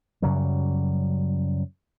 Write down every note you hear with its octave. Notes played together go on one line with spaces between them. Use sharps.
F#2 C#3 F#3 G3